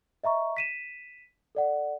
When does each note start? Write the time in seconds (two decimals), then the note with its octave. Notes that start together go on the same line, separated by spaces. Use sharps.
0.24 D#5 E5 A#5 C#6
0.57 B6 D#7 E7
1.55 A4 D5 F#5